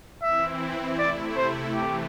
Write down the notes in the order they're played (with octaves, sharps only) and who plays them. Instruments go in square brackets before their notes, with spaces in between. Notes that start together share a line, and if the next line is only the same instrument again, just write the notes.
[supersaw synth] E3 C4 E4 [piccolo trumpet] E5
[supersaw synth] C3 A3 E4 [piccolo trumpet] D5
[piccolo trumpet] C5
[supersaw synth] C3 E3 A3 [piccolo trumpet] G4